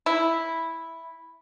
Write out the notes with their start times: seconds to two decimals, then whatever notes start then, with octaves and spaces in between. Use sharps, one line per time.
0.06 E4